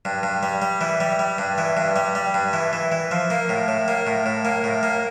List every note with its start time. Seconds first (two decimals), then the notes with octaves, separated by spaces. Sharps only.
0.05 G2
0.23 G2
0.43 G3
0.62 G3
0.81 E3
1.00 G3
1.19 G3
1.38 G2
1.58 E3
1.77 G2
1.96 G3
2.15 G3
2.34 G2
2.53 E3
2.73 E3
2.92 E3
3.11 F3
3.30 A#3
3.49 A2
3.68 A2
3.88 A#3
4.07 A2
4.26 A2
4.45 A#3
4.64 A2
4.83 A#3